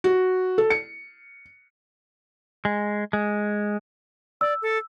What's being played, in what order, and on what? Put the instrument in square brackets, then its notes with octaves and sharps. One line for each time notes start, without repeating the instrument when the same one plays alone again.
[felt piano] F#4
A4
C#7
[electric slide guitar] G#3
G#3
[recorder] D5 [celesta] E6
[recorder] A4